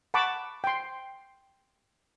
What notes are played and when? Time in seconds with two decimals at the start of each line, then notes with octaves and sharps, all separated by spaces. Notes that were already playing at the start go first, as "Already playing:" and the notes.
0.14 F#5 A5 B5 C#6 D6
0.64 G5 C6